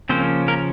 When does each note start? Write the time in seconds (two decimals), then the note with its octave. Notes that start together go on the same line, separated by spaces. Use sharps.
0.09 C#3 F3 A#3 C4 C#4 C5
0.48 A#3 A#4